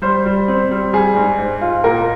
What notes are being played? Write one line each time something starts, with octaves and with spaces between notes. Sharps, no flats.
G3 C5
G3
C4
G3
G3 G#4
G#2
G#2
F4
A#2 A#4